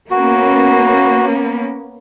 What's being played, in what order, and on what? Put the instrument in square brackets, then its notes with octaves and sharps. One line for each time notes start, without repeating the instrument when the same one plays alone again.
[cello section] A#3 B3 C#4 [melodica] F#4